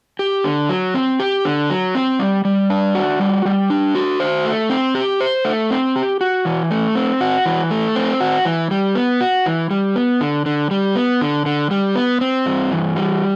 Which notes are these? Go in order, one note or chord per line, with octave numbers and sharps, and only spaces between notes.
G4
D3
F#3
C4
G4
D3
F#3
C4
G3
G3
D4
F#4
G3
G3
D4
F#4
C5
A3
C4
G4
C5
A3
C4
G4
F#4
E3
A3
C4
F#4
E3
A3
C4
F#4
E3
G3
B3
F#4
E3
G3
B3
D3
D3
G3
B3
D3
D3
G3
B3
C4
G2
E3
G3